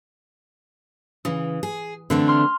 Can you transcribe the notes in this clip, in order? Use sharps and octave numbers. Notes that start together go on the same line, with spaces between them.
C#3 E3 D#6
G#4
D3 E3 A3 C4 D4
C6 F6